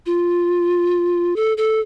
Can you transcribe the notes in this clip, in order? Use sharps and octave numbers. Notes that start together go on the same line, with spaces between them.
F4
A4
A4